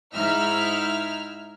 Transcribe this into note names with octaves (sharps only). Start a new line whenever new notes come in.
G#2 D#4 E4 E5 F6